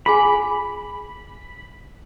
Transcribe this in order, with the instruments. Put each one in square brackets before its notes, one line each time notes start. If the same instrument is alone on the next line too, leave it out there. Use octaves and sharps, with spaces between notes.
[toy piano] F4 G#4 G#5 [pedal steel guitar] B5